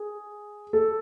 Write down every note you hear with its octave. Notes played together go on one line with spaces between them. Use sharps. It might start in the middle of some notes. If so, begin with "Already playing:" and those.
Already playing: G#4
A4